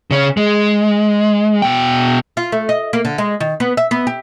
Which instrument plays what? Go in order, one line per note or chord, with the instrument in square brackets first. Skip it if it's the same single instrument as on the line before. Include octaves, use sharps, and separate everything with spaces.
[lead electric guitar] C#3 C#4
G#3
B2 G5
[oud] F4
A3
D#5
A#3
D3
G#3
D#3
B3
E5
B3
G4